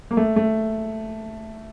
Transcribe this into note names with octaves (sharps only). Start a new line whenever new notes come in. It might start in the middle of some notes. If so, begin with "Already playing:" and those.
A#3
A3
A3